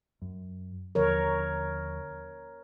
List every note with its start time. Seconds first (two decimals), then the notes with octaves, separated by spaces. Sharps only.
0.22 F#2
0.95 D#2 D3 F3 A#4 C#5